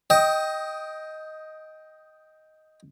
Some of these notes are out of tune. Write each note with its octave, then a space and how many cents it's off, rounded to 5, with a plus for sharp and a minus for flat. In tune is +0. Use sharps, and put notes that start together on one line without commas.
D#5 +5 G5 +0 D#6 +25